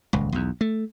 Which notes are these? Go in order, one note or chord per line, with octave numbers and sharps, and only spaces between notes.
D#1 C#2
B1 E2
A3